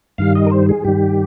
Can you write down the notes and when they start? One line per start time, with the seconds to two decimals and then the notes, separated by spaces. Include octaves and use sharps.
0.18 G2 D#3 G3 F5
0.35 D#5
0.46 A#4
0.51 C5
0.69 G#4
0.85 G2 D#3 G3 G4